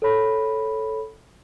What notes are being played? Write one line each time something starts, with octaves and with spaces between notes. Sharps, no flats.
A4 C#5 B5